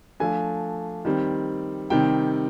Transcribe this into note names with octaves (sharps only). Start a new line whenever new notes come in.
F3 A3 D4 G#5
D#3 G3 C4
C3 D#3 G3 C4 G5